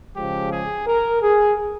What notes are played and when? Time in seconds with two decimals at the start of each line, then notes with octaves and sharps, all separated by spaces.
0.15 C#3 F3 G#3 G4
0.51 G#4
0.87 A#4
1.22 G#4